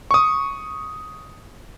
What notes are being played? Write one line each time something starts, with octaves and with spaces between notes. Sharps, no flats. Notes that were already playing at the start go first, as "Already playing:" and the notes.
C#6 D#6